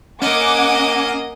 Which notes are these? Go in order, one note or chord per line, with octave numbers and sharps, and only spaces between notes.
A#3 C#4 D#5 F#5 G#5 D6